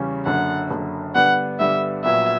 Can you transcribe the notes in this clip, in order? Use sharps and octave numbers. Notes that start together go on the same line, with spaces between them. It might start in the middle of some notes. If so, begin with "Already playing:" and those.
Already playing: E2 C#3 G3 C#4
F#1 F#2 D3 F#5
F#1 F#2 D3
G2 D3 G3 B3 D4 F#5
G2 D3 G3 B3 D4 E5
A#1 A#2 F#3 B3 E5